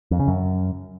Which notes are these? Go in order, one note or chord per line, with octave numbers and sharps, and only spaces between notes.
F2
C#3
F#2